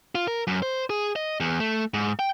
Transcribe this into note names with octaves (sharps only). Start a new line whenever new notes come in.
F4
A#4
F#2
C5
G#4
D#5
E2
A3
G#2
G5